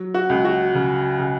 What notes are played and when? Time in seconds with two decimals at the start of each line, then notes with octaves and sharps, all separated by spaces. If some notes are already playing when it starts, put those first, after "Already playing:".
Already playing: F#3
0.14 F#4
0.29 C#2
0.45 F#4
0.75 C#3
1.19 C#3